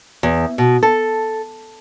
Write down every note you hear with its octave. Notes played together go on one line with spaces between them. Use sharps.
E2
B2
A4